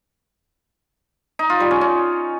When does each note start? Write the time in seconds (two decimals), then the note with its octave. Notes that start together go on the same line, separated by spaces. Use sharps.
1.39 D#4
1.50 F4
1.60 G3
1.71 C#4
1.81 C#4